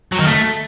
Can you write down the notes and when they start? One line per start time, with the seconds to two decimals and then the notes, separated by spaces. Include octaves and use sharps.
0.12 F#3
0.19 D#3
0.27 A3